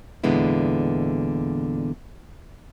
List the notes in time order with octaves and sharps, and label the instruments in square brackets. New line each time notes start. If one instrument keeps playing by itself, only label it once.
[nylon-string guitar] E2 A#2 D3 G#3 B3 E4